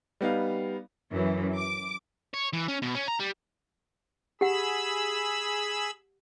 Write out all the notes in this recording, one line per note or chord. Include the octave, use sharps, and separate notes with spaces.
G3 B3 D#4 F5
F#2 E3
D6
C#5
E3
C#4
B2
C#4
A#5
G3
G4 G#4 F#5 B5 E6